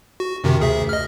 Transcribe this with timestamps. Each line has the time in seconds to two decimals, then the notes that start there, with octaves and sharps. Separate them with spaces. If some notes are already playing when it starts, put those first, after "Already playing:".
0.20 F#4
0.44 F#2 C3 D#3
0.60 D2 G#4 E5
0.89 D#5 F6